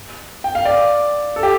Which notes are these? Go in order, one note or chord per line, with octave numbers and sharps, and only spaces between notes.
G5
F5
D5
A4
G4